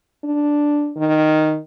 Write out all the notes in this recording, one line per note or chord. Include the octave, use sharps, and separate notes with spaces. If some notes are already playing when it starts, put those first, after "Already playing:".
D4
D#3